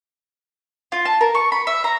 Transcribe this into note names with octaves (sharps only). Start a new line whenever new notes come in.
F4
A5
A#4
C#6
B5
E5
A#5